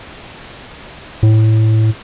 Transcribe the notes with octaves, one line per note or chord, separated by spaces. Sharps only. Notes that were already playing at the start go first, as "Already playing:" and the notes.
A2